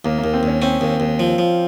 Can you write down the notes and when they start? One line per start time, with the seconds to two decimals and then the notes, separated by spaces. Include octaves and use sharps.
0.05 D#2 A#3
0.18 A#3
0.24 D#2
0.34 C4
0.43 D#2 C#4
0.62 C4 C#4
0.81 D#2
1.00 D#2
1.20 F3
1.38 F3